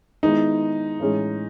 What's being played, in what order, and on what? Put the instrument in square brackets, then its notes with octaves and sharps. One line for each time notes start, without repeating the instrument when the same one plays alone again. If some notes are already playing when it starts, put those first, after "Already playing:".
[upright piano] D#3 G#3 B3 E4 [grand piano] D#4
[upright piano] A2 E3 G#3 C#4 G#4